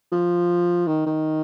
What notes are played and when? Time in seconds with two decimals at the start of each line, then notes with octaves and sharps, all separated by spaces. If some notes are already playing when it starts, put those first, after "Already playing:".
0.12 F3
0.87 D#3
1.06 D#3